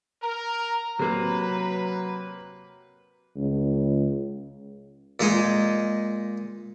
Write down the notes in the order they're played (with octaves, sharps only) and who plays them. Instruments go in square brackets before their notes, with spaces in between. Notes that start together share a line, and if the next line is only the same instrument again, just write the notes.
[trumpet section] A#4 [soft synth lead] A#5
[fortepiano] C3 A#3 [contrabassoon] F#3 [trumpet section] B4
[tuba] C#2
[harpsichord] A#2 G#3 D#4 G#5